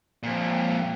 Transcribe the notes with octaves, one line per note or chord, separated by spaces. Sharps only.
F2 A#2